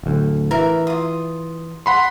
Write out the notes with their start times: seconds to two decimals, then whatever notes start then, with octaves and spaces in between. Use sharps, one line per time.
0.03 D1 D2
0.51 E3 A#4 E5
0.87 F4 D#6
1.86 F#5 B5 C6